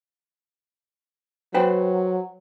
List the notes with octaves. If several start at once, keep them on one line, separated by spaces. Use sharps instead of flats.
F#3 B4 C5 G5